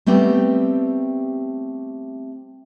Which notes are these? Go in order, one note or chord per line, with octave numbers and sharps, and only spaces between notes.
G3 A3 B3 C4 G4